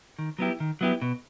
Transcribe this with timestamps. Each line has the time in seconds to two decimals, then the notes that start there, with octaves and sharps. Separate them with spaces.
0.19 D#3
0.39 F#3 B3 E4 G4
0.60 D#3
0.81 F#3 B3 E4 G4
1.02 B2